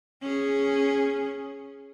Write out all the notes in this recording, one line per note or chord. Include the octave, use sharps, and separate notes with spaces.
C#4 G#4